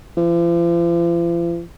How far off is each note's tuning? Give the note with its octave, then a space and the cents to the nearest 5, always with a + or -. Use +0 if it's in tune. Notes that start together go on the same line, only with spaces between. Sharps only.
F3 -45